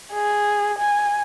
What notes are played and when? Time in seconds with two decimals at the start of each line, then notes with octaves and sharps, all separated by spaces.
0.13 G#4
0.79 G#5